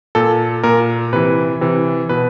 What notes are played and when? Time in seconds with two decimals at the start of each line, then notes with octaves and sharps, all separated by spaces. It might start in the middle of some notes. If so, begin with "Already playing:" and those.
0.15 A#2 A4
0.63 A#2 A#4
1.13 C3 E3 B4
1.61 C3 E3
2.09 B2 B4